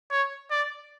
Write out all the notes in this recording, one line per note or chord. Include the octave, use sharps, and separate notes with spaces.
C#5
D5